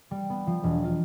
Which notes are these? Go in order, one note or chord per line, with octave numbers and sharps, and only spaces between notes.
G3
B3
F3
E1
F4